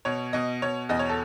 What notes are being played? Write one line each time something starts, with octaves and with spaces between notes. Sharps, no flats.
B2 C#5
B2 D#5
B2 C#5
E2 D#5
C#5
A4